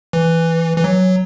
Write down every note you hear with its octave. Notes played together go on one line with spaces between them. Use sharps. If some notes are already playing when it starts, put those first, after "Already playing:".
E3
E3
F#3